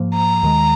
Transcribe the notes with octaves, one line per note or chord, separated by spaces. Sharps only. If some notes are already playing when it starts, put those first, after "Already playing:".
Already playing: G#2 F3 A#3
A#5
D#2 D#3 G#3